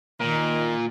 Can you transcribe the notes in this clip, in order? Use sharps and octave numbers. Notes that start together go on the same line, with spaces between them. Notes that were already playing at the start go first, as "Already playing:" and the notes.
A#2 D#3 A#4